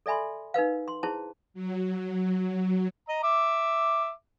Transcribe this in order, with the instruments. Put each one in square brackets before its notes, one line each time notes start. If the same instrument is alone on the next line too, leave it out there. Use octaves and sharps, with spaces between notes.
[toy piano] A4 D5 E5 G#5 B5 C6
D#4 A#4 B4 F5
C6
E4 G#4 C5 A5
[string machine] F#3
[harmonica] D#5 A#5
E5 D6